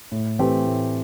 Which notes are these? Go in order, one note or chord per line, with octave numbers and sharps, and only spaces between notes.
A2
E3 A3 C4 G4
A2